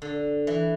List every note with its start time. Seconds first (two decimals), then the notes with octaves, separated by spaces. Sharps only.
0.02 D3
0.47 E3